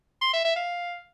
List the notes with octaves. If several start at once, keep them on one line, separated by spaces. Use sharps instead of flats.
C6
E5
E5
F5